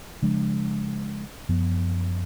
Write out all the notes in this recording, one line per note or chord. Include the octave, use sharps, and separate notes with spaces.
C#3 F3 G#3 D4
F#2 F3 B3